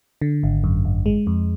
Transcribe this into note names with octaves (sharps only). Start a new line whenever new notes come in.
D3
G#1
F#2
G#1
G#3
F2